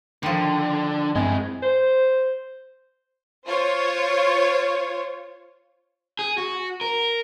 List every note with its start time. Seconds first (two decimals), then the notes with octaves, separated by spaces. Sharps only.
0.23 D3 D#3 F3
1.16 G2 G#3 C4 E4 D#5 G#5
1.62 C5
3.47 F4 C5 C#5
6.19 G#4
6.38 F#4
6.81 A#4